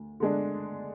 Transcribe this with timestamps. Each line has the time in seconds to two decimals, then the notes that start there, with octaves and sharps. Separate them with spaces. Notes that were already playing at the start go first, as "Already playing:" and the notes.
Already playing: D2
0.20 D3 G#3 D4